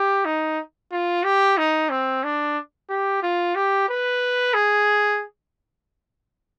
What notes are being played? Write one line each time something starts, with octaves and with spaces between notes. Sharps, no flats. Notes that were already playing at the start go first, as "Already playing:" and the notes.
Already playing: G4
D#4
F4
G4
D#4
C4
D4
G4
F4
G4
B4
G#4